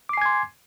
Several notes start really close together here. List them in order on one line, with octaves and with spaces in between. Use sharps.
D6 C7 G#5 G#6 C6